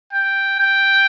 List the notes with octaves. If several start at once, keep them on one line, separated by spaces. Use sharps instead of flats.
G5
G5